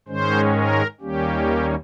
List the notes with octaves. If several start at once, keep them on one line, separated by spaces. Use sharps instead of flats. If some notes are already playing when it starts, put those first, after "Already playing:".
G#2 D#3 G#3 C#4 C5
A#4
D#2 D#3 G3 A#3 C#4 G4